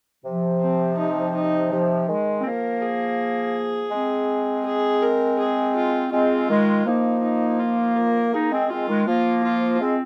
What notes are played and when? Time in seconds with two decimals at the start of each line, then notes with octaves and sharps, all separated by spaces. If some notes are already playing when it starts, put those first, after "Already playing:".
0.24 C3 F3
0.61 C4
0.98 D#4
1.35 D#4
1.71 C3 F3
2.08 D#3 G#3
2.40 C4
2.44 F3 A#3 A#4
2.82 G#4
3.92 G#3 C4
4.66 G#4
5.02 A#4
5.39 G#4
5.76 F4
6.12 G#3 C4 F4
6.49 D#3 G#3
6.86 F3 A#3 D#4
7.22 D#4
7.59 F4
7.96 A#4
8.33 A#3 D#4 G#4
8.52 G#3 C4
8.70 G#3 C4 F4
8.88 D#3 G#3
9.07 F3 A#3 F4
9.43 F4
9.81 G#3 C4